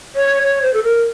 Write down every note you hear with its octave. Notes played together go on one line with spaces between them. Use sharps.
C#5
C#5
C5
A4
A#4